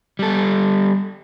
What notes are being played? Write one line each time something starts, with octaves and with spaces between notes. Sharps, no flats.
G3 A4